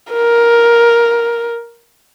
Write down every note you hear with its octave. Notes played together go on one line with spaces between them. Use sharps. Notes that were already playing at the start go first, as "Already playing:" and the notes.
A#4